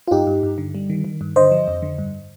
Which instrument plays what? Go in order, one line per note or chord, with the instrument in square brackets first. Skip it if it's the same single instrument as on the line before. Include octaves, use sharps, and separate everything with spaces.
[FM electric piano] F4
G2 D#4 G4
G2
G2
D3
G3
D#3
D#3
G2
D3 C5 D#5
F3
F2
D3
G2